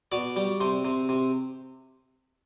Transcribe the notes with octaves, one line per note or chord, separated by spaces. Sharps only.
B2 D5
G3
C3 C5
C3
C3